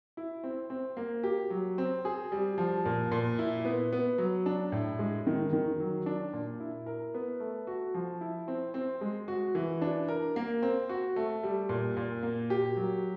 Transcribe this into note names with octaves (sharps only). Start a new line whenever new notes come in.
E4
C4
C4
A#3
G4
F#3
C4
G#4
G3
F3
A#2
A#2
E4
B3
B3
F#3
D4
A2
G#3
D#3
D#3
F#3
D4
A#2
E4
A#4
B3
A3
F#4
F3
E4
C4
C4
G#3
F#4
E3
D4
A#4
A#3
C4
F#4
A3
G3
A#2
A#2
A#3
G4
F#3